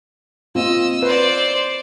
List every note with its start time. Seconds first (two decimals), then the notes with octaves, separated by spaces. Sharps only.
0.55 A#3 C4 F4 D#5 E6
1.03 B4 C5 D5